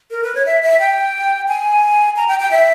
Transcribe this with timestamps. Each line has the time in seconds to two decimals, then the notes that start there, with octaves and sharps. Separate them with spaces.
0.11 A#4
0.23 B4
0.35 C#5
0.46 E5
0.62 E5
0.80 G5
1.48 G#5
2.16 A#5
2.28 G5
2.39 G5
2.51 E5